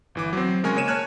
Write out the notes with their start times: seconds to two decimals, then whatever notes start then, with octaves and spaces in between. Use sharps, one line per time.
0.15 G1 E3 D6
0.33 F#3 C4
0.63 C#3 G#3 A#4 G#5 C#6
0.77 A#3 C#5 D#7 E7
0.88 C#5 A5 F6 F#6 G#6